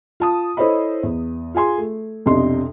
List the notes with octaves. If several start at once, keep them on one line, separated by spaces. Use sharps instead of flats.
F4 A5 D#6
E4 A4 C5 C#5 D#5 B5
E2
F4 G#4 G#5 C6
A3
B1 F2 C3 D4 D#5 C6